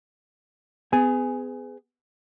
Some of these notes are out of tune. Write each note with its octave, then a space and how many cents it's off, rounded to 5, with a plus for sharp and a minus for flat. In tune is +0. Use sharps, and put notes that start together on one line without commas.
B3 +35 G#4 +0 G#5 +0